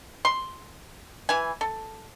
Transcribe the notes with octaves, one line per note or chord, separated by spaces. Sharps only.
C6
E3 G#5
A4